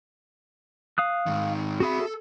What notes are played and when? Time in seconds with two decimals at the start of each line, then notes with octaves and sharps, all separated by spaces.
0.98 F5 D#6 F#6
1.26 G#2 D#3
1.80 C4 F#4 G#4 E5 B5
1.99 A4